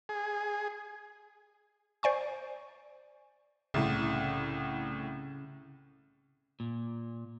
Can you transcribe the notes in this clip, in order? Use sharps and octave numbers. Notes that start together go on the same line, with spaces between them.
G#4
C5 D5 G#5 C#6
C2 A2 C#3
A#2